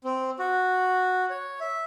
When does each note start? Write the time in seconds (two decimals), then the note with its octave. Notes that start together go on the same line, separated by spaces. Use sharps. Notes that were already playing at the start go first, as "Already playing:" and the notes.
0.04 C4
0.39 F#4
1.30 C#5
1.61 E5